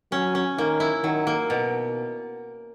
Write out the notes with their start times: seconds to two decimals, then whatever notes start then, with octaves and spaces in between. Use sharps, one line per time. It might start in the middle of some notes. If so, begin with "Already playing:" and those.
0.12 F#3 C#4
0.35 C#4
0.58 D#3 A#3
0.80 E4
1.04 D#3 F#3
1.27 A#3
1.50 B2